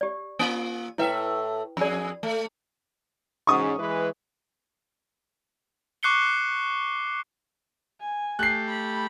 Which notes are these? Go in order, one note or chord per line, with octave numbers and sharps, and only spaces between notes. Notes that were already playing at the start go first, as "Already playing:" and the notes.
G4 D5
A#3 F4
A2 E4 B4 E5 G5
F2 G#4 D5 B5
A3
G#2 C#4 C#6 D#6
E3 G#3 B4
C#6 D6 F#6 C7 C#7 G7
G#5
A3 G4 F#6 C7
B5